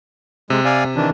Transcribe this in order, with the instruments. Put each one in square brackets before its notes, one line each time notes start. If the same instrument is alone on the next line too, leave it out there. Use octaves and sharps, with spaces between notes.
[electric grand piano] C3 [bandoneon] G#3
[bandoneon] D5 F5 G#5
D#3 E3 D4